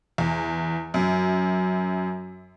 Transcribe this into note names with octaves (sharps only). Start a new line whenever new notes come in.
E2
F#2